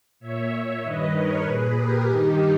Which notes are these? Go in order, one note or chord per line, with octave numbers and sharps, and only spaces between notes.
A#2 C#5 E5
G2 D#3 B4 D#5
A#4 C#5
A#2 G#4 B4
G4 A#4
G2 D#3 D#4 G4